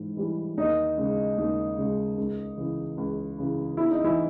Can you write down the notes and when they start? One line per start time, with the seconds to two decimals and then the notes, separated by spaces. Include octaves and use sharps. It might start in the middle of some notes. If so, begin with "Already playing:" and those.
Already playing: G#2 E3
0.17 E3 G3
0.58 D#2 D#4
0.97 C#3 G#3
1.38 D#2
1.77 C#3 G#3
2.17 C#2
2.57 C#3 E3
2.97 C#2
3.38 C#3 E3
3.77 E2 E4
3.91 D#4
4.04 E3 E4